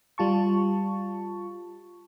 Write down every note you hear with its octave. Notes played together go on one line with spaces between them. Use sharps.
G3 F4 A5 C#6